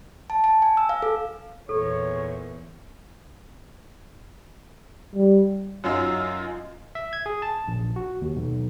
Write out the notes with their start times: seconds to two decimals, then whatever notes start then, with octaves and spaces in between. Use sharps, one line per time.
0.30 A5
0.44 A5
0.62 G#5
0.77 E6
0.89 F5
1.02 A4
1.69 E2 A#2 A4 C#5
5.15 G3
5.84 F#2 F#3 D#4 F4 E6
6.95 E5
7.13 G#6
7.26 G#4
7.42 A5
7.68 A#1
7.96 F#4
8.22 D#2
8.36 B1